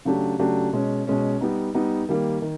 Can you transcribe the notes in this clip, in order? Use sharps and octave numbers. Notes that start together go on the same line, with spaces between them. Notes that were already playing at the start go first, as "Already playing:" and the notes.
C#3 F#3 A3 D4 G4
C#3 F#3 A3 D4 G4
B2 G#3 C#4
B2 G#3 C#4
G3 B3 D#4
G3 B3 D#4
D#3 G3 A#3
D#3